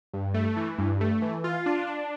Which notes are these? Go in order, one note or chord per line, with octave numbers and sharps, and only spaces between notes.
G2
A3
E3
G2
A3
E3
F4
D4
D4